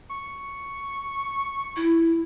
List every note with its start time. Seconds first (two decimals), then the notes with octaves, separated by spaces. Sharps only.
0.10 C#6
1.76 E4